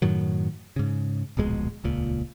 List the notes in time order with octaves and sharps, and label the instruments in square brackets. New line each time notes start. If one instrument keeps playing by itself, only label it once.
[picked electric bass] F#2 A2 D#3 F#3
G#2 C#3
D1 A#1 B2 G#3
D#1 C#2 A#2